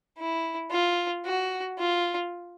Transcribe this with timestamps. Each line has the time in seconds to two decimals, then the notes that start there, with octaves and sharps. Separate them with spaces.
0.18 E4
0.71 F4
1.25 F#4
1.78 F4